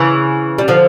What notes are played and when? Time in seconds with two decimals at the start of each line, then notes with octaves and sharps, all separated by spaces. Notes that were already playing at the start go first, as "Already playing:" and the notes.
Already playing: C#3 E3
0.58 G3
0.68 D3 F3